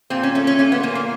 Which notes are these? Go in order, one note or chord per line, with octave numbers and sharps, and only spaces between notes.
A#2 C4
C#4
A3 C#4
C#4
A#2 C#4
B3
A#2 A#3
A#3